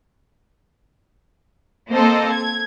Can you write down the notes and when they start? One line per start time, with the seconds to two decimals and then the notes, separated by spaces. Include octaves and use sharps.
1.93 A#3 C4 A4 C5 D#5
2.31 G#6